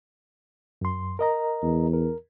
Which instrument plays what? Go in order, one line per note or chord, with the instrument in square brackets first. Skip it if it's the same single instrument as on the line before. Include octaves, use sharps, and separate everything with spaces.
[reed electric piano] F#2 C6
A#4 D#5 A#5
[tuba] E2
[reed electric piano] A#4